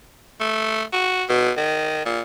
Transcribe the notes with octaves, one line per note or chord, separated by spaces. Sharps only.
A3
F#4
B2
D#3
A#2